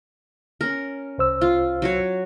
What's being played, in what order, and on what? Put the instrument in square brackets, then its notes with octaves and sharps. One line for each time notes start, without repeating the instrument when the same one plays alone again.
[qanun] C#4 A#4
[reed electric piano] C2 C5 E6
[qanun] F4
F#3 F#4 C#5